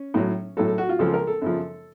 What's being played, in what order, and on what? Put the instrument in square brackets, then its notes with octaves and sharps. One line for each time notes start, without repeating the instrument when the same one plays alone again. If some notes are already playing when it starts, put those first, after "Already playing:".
Already playing: [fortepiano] C#4
A2 F#3
A2 F#3 A4
A4
F#4
F4
C#2 C#3 F3 A4
A#4
A4
F#2 C#3 F3